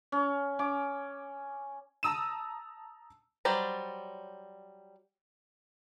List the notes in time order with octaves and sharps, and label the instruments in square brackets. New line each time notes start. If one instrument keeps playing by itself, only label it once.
[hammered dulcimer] C#4
C#4 D6
[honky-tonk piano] A5 A#5 D#6 E6 D#7 E7
[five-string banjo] F#3 G3 C5 D5 A#5